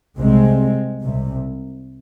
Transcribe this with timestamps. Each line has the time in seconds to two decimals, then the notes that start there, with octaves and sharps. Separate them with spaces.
0.19 C2 C3 G#3 C4
1.02 C2 C3